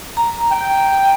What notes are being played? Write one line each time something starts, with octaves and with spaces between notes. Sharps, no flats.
A#5
G5